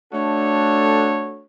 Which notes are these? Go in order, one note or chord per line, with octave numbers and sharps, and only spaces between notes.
A3 D4 F#4 A4 C#5